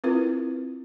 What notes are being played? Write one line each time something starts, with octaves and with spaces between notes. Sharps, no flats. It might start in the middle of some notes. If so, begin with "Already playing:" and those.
C4 E4 F4 A#4 B4